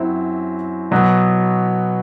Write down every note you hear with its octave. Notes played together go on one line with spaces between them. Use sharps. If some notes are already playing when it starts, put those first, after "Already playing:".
Already playing: F#2 F#3 C4 E4
B2 F#3 B3